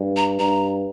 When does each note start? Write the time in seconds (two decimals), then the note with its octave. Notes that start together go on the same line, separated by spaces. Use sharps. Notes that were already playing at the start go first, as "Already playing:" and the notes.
Already playing: G2
0.16 A#5
0.39 G2 A#5